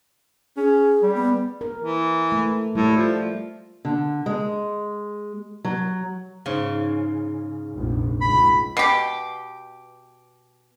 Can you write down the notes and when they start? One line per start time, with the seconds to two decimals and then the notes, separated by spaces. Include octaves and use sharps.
0.57 C#4 G#4
1.02 G3
1.15 B3
1.61 A#4
1.83 E3
2.32 A3
2.75 A2 G3 A3
2.97 F3
3.85 D3
4.26 G#3
5.65 F#3
6.46 G#2 C#3
7.73 F1 A#1
8.21 C#2 B5
8.77 B2 G4